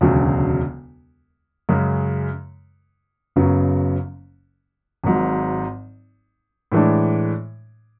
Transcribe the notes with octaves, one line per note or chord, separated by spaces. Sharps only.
E1 D2 C#3 F#3
F#2 C#3 G#3
F#1 F#2 C#3 F#3 B3
G#1 G#2 F#3
A2 E3 G#3 D4